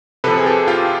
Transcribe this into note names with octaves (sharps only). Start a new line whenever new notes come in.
C3 F3 A4 B4
G#4
G4 A4
F4 G4